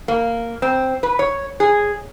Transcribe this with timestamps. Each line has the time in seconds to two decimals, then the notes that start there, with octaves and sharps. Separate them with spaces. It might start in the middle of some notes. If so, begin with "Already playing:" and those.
0.08 A#3
0.62 C4
1.03 B4
1.19 C#5
1.60 G#4